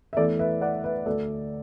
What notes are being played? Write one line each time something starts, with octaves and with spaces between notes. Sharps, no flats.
E5
E2 E3 A3 A4 D5
B4 E5
D5 F#5
B4 E5
D2 D3 A3 A4 D5